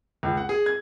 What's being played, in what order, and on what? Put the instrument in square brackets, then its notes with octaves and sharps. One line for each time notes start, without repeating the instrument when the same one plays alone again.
[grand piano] C#2
F#5
G#4
G#6